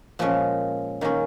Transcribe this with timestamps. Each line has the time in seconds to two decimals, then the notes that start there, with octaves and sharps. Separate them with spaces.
0.19 A#2 F3 G#3 C#4
1.01 D#3 A#3 C#4 G#4